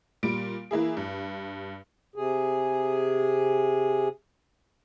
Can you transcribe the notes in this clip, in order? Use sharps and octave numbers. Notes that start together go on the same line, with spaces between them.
A#2 G3 D7
E3 A#3 E4 G#4
G2
C3 G#4